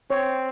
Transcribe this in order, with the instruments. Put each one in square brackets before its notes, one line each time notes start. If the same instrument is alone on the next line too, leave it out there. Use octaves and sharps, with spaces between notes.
[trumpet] C4 [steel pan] C#5